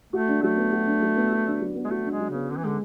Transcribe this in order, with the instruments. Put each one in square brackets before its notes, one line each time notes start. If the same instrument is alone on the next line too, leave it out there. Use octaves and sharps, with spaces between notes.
[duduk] A3 [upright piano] F#4
[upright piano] D4
[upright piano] F#3 [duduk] A3
[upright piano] B3
F#4
D4
F#3
B3
F#4
D4
F#3
B3
[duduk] G#3
[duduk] A3 [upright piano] F#4
[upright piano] D4
[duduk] G#3
[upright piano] F#3
[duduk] C#3 [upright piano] B3
[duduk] D3 [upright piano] C#4
[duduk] E3
[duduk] D3 [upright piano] G#3